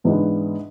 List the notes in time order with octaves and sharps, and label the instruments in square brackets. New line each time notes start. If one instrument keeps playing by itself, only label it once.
[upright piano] G#2 E3 B3 D4